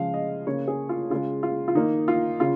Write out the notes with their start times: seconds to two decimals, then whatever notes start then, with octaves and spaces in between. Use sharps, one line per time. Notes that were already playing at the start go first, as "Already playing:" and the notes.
Already playing: C#3 F3 G#3 F5
0.14 D#5
0.47 C#3 A#3 C#5
0.68 G#4
0.89 F4
1.10 C#3 G#3 F4
1.43 F4
1.68 F4
1.75 D#3 A#3 D#4
2.08 F4
2.40 C#3 F4